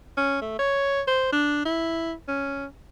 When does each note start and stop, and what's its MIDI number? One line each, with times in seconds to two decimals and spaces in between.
0.17 0.41 61
0.41 0.57 57
0.59 1.01 73
1.08 1.30 72
1.32 1.62 62
1.65 2.13 64
2.29 2.66 61